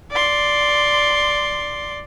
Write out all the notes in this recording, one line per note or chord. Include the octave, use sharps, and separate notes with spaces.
D5 C6